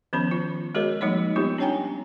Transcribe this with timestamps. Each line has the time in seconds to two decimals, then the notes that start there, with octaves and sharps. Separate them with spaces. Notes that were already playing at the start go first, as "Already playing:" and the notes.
0.13 D#3 F3 B3 C#4 B5
0.31 F4
0.74 G#3 F#4 G#4 A#4 C#5 D#5
1.01 F3 G3 A#3 D#4 C#5 D#5
1.36 G3 B3 D#4 F4 G4
1.58 C#4 D4 C#5 G5 G#5 A#5